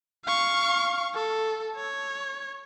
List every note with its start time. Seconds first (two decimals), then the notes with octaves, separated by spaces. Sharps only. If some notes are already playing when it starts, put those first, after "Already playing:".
0.25 F5 C#6
1.15 A4
1.76 C#5